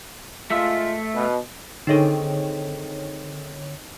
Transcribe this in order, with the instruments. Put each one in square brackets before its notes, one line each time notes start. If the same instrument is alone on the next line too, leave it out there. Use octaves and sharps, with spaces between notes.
[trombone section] G#3 F4 [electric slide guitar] A3 E5
[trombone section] B2
[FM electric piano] D3 C#5 [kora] D#3 C4 [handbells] D#4 G#4 A4